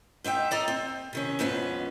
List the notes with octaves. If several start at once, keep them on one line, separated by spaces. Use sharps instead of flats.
G#2 D#4 E5 G5
A4 D5 D#5 A#5
C4
C3 D#3 C#4
F2 G#2 B3 C#4